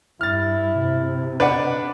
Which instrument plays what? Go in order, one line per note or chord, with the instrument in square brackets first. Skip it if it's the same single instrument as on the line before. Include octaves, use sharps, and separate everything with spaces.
[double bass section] G2 [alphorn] E4 [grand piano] F6 A6
[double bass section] C3
[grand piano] D4 D6 [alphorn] D#4 [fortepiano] B4 D5 F#5